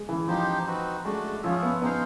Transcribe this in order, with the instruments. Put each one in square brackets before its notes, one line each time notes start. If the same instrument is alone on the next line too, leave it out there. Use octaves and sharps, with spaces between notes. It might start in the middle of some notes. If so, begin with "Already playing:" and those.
Already playing: [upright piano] G#3
E3
[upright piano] F3 [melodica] D#4 G4 C5
[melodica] C4 D#4 F#4 B4
[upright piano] G#3 [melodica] A3 D4 F#4
[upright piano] F3 [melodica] F4 G#4 C#5 E5
[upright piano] B3
[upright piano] B3 [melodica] D#4 G#4 C5 F5